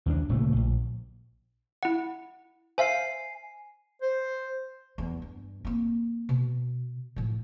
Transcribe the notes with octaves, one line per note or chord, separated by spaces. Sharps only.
D#2 A#3 D4
D1 A#2 C#3 A3
A#1
E4 F#5
C5 E5 F5 G#5 C7
C5
E2 G#3
G2
A#3 C4
B2
A2 F3